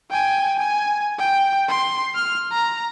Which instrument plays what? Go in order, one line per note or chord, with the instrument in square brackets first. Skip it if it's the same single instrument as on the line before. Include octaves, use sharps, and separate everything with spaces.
[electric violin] G5 G#5
G#5
G5
C6
F6
A#5